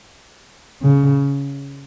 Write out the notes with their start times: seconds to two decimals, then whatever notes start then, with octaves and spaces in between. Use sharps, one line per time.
0.82 C#3